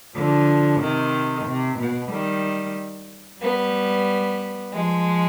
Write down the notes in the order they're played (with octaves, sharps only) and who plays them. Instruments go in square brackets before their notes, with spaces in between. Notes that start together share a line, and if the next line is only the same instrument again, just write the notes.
[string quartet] D3 F3
C3 D#3
C3
B2
D#3 G3
G3 B3
F3 G#3